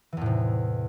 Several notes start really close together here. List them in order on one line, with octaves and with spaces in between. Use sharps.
E3 E2 A2 C3